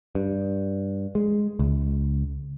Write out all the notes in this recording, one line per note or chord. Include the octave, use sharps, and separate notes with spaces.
G2
G#3
C#2